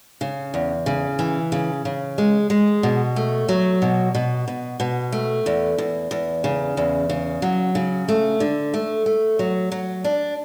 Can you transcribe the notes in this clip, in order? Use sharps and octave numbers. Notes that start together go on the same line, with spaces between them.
C#3
E2
C#3
E3
C#3
C#3
G#3
G#3
B2
A3
F#3
B2
B2
B2
B2
A3
E2
E2
E2
C#3
E2
C#3
F#3
C#3
A3
D3
A3
A3
F#3
F#3
D4